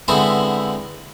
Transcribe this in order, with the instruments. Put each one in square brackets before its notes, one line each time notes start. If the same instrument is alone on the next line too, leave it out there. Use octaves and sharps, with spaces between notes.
[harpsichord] D3 G#3 B3 C4 E4 C5